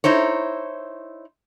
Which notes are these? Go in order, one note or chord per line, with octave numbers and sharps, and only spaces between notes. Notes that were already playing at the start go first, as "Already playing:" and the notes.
D#4 E4 C5 C#5